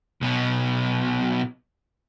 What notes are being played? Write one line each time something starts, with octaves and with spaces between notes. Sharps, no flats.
B1 B2